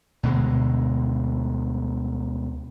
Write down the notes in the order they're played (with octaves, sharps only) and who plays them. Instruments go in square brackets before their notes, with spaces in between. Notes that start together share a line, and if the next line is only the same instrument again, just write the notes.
[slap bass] D2 B2 D3 G#3